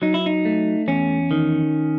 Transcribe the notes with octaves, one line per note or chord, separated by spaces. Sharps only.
F#3 D#4
E4
D#4
A3
E2 C#4
D#3